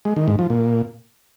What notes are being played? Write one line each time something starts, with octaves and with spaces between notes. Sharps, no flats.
G#3
D#3
G#2
F3
A#2